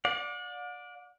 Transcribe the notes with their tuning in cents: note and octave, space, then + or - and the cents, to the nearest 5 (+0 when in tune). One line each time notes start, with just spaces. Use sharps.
D5 +0 F#5 -45